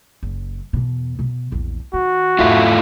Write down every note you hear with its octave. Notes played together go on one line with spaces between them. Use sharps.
F#1
E2 B2
B2 B3
A#1 E2
D#3 F#4
E2 G#2 A3 E4 F4